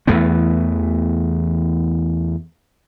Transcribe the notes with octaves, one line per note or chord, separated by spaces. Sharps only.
E2 E3 A3 B3